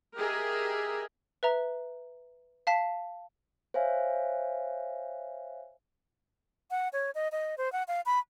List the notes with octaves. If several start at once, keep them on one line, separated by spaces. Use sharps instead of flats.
G4 G#4 A#4 D#5 E5
B4 E5 A#5
F5 A5 B6
C5 C#5 E5 F5 G#5
F#5
C#5
D#5
D#5
C5
F#5
F5
B5